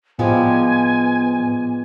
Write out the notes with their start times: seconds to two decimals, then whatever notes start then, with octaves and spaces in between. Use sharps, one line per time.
0.19 A2 F3 G3 G#3 B3 G#5